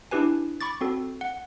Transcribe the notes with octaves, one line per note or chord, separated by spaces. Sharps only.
D4 E4 G4 B4 G#5
B5 C#6 D6 A6
C4 F#4 A4
F#5